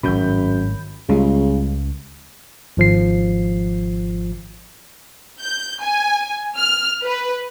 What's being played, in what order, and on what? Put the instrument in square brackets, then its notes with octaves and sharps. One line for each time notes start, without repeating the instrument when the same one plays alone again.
[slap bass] G#1 A2 [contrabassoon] F#2 [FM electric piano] B5 G6
[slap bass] C#2 [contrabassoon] C#3 [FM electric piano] G3 G#3 F4
[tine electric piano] G#1 F3 C7
[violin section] G6
G#5
F6
B4